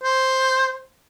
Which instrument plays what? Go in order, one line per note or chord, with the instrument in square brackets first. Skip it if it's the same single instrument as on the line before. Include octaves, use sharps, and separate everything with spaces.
[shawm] C5